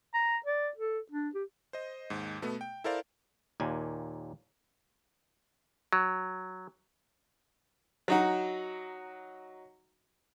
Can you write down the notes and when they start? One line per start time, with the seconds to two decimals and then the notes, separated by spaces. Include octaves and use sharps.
0.14 A#5
0.46 D5
0.77 A4
1.11 D4
1.35 G4
1.73 C5 D#5
2.10 D#2 G#2
2.42 B2 A3 B3
2.61 G5
2.84 E4 A4 A#4 C5 D5 F5
3.60 D#2 A#2 G#5
5.93 F#3
8.08 F#3 D#4 F#4